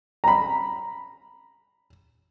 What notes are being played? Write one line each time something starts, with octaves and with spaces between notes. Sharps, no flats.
A#5 B5